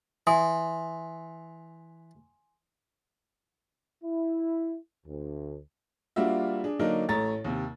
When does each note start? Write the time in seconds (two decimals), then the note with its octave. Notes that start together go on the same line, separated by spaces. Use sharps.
0.27 E3 G#5 C6 D#6
4.03 E4
5.07 D2
6.16 G3 A#3 D4 F4 F#4 E5
6.64 D4 G#4
6.80 D3 F#3 A#3 D4 D#4 A#4
7.09 A1 A3 C#5 A#5 A6
7.44 D#2 C3